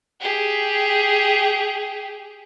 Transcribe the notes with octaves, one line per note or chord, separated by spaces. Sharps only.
G4 G#4